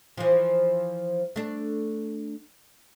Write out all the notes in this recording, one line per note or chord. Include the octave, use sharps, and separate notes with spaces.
E3 F3
A3 D4